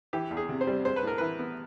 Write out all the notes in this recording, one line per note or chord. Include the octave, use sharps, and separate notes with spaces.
E3 G4
E2
G#4
C3
C5
G3
G#3 C5
B4
A2 A#4
E3 B4
B3